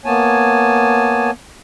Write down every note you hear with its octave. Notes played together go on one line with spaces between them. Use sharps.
A#3 B3 C#5 G#5 A5